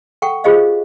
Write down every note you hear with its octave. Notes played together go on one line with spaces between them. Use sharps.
A4 F#5 G5 C#6
F4 G4 G#4 C5 D#5 F5